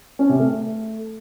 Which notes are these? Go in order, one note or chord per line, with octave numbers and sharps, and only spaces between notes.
C#4
C3
A3